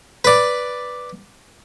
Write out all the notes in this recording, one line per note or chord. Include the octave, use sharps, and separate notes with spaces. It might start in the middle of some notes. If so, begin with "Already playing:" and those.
B4 D5